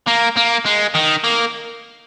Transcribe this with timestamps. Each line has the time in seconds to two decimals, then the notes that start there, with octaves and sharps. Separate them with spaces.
0.07 A#3
0.36 A#3
0.65 G#3
0.95 D#3
1.24 A#3